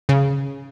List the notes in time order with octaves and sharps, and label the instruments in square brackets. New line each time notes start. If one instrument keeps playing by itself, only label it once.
[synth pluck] C#3